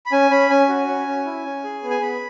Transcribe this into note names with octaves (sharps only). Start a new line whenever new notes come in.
B5
C#4 G#5
C#4 B5
C#4 G#5
F#4
C#4
C#4
E4
C#4
G#4
B3
G#5
B3 B5